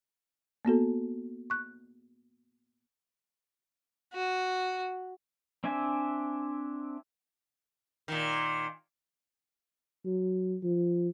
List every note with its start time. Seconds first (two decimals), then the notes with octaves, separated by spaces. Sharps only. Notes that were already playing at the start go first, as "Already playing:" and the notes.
0.65 A#3 B3 F#4 A4
1.50 C#6 F#6
4.13 F#4
5.64 C4 D4 E5 G#5
8.08 A#2 D#3
10.05 F#3
10.63 F3